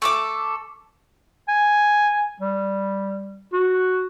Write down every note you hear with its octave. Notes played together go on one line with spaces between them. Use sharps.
A3 A4 D6
G#5
G3
F#4